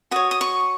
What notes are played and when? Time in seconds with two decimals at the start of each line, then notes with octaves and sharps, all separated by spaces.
0.11 F#4 C#5 D#6
0.31 D#6
0.41 C#6